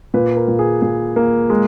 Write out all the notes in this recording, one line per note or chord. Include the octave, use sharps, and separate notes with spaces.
A#2 B4
A#4
A#2
G#4
A#2 G#4
A#3
G#3